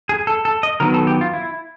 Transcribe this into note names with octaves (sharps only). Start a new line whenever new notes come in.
G#4
A4
A4
D#5
D#3 F#3 B3 A#4
A4
G4
F4
E4